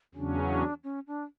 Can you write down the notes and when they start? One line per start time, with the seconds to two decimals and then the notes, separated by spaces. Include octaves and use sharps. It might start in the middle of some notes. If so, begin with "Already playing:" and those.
0.15 E2 C#3 F#3 C#4 D4
0.50 D4
0.84 C#4
1.07 D4